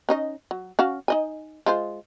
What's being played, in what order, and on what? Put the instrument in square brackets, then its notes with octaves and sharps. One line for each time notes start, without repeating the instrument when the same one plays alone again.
[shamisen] C#4 D#4 D#5
F#3
C#4 F#4 F5
D#4 D#5 G#5
G#3 F4 C5